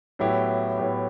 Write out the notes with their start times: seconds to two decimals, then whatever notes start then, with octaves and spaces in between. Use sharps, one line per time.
0.19 A2 F#3 B3 E4 G4
0.78 A2 F#3 B3 E4 G4